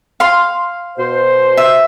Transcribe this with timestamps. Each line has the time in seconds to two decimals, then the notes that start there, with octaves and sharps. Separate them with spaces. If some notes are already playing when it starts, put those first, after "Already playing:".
0.20 F5 C6
0.98 B2 C5
1.57 E5